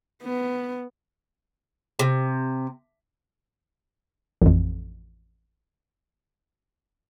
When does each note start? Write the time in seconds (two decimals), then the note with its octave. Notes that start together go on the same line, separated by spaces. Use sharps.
0.23 B3
1.99 C3
4.42 A1 F2